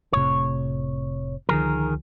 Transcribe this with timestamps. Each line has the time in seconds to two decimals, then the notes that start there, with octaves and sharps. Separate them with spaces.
0.13 F1 A2 C3 C#5
1.49 C#2 D3 D#3 F3 G#4 A#4